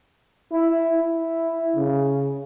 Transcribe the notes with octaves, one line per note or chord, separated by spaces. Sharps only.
E4
E4
C#3